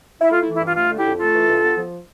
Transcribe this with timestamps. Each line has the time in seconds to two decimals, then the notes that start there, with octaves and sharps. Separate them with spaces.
0.21 E4
0.31 A3 F4
0.43 E4
0.46 E3
0.54 E4
0.61 G2 F4
0.75 A3 F4
0.90 D3
0.97 E4 G4
1.04 F2
1.19 A3 F4 A4
1.34 E3
1.48 G2
1.63 B3
1.78 F3